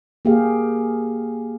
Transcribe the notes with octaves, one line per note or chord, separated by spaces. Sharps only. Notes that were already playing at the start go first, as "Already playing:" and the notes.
A#3 G4 G#4 F5